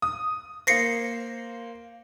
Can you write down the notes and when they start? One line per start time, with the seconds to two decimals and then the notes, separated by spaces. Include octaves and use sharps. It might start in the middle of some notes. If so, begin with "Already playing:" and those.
0.02 D#6
0.67 A#3 C5 A#6 C7 C#7